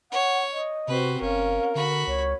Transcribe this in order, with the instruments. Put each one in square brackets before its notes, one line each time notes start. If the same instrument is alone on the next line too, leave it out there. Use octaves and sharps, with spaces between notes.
[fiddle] C#5 [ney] F#5
[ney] D#5
[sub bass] C3 [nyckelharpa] C4 F#4 [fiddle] B4 C5
[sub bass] F#1 [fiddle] C#4 [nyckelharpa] A#4 [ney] F5
[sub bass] D3 [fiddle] F#4 B5
[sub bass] C#2 [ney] C#5